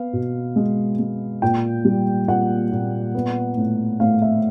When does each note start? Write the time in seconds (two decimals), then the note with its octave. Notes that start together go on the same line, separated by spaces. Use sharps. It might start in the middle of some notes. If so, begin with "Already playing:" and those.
Already playing: B3 F5
0.13 B2
0.56 G#3
0.99 G#3
1.42 A#2 G5
1.85 G3
2.28 A#2 F#5
2.72 A#2
3.15 B3
3.57 A2
4.00 A2 F5
4.22 E5